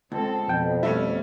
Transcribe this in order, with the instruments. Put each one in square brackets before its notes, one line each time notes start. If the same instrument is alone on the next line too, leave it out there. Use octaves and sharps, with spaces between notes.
[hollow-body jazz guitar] C#2 [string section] G#3 C4 A4
[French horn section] F2 [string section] B2 F3 [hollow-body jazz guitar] G5
[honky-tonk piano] G3 A3 C#4 [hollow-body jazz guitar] E5